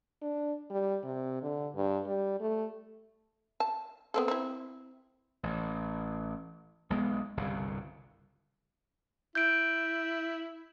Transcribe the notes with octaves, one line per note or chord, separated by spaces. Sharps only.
D4
G3
C3
D3
G2
G3
A3
A5
B3 C4 A4
C4 E4
A1
B1 G#3 B3
G1 C2 C#3
E4 G6 D7